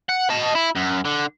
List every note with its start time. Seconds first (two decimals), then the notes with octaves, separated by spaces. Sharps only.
0.09 F#5
0.30 D#5 A5
0.55 E4
0.75 F#2
1.05 D3